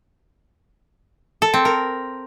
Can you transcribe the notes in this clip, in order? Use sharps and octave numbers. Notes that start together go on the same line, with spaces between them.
A4
C4
A#4